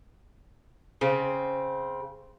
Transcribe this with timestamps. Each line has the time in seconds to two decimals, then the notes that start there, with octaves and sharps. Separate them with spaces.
1.01 C#3 C4